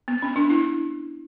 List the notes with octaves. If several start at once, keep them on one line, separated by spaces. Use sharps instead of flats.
B3
C#4
D4
E4